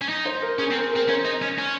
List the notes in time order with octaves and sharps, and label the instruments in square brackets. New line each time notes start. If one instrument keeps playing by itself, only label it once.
[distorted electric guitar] C#4
D#4
[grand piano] C5
A#4
[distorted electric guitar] C#4 [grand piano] G#4
[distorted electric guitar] C4
[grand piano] A#4
[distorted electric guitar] C4 [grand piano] A#4
[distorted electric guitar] C#4 [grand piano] C5
[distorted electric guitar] D#4
C#4
C#4